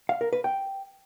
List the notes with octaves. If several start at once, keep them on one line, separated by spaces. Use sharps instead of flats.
F5
A#4
B4
G5